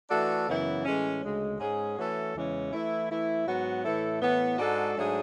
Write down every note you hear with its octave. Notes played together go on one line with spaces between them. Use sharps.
E3 A3 D4 F#4 A4
F#2 C#3 E3 B3 E4
A2 E3 G#3 C#4
D2 C#3 G#3
G#2 G#3 C#4 G#4
E3 A3 C#4 F#4 A4
E2 C#3 E3 G#3 C#4
E3 A3 E4
E3 A3 E4
G#2 F#3 B3 F#4
A2 E3 A3 E4 A4
A2 E3 B3
G#2 G#3 D4 F#4 A4
G#2 F#3 A3 D4 G#4